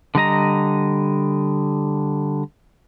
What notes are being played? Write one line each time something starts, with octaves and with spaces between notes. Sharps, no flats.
D3 G3 D#5 A#5